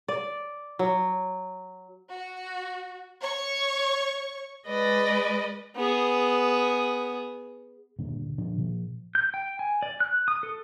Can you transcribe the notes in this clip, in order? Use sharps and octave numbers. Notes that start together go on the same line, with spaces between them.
D5
F#3
F#4
C#5 C#6
G#3 B4 D5 D#5
B3 G#4
D#1 G2 A#2 D3
A#2 D3 F3 D4
A#2 F3
G6
G5
G#5
D5
F#6
D#6
A4